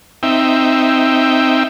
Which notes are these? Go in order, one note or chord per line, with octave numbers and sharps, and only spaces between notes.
C4 D#4 E5 G5